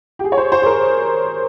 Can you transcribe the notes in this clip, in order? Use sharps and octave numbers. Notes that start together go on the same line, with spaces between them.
G4
G#4
C#5
C5
C5
G#4
A#4